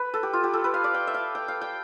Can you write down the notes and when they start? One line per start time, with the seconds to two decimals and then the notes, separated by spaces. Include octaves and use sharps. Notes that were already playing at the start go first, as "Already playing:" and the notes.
Already playing: B4
0.14 A4
0.23 G4
0.33 F4
0.44 G4
0.53 A4
0.64 B4
0.74 F5
0.84 D5
0.94 G5
1.07 E5
1.14 F5
1.35 G5
1.48 F5
1.62 G5